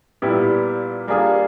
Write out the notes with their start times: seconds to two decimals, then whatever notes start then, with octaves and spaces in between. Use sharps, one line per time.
0.22 A#2 G3 B3 E4 G4
1.08 G3 A#3 D4 F4 G#4